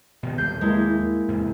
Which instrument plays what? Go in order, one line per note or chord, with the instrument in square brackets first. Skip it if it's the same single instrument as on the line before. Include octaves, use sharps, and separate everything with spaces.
[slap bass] B2 D#3
[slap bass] D#2 A2 G3 [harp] G6 C7
[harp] G#3 A#3 E4
[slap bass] E2 G#2 C3